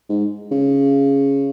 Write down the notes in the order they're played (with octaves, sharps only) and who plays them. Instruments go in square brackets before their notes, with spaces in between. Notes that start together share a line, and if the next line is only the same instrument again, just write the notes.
[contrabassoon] G#2
C#3